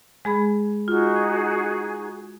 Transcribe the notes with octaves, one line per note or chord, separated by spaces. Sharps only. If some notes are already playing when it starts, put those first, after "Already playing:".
G#3 G#4 B5
D#4 F4 F#4 G#4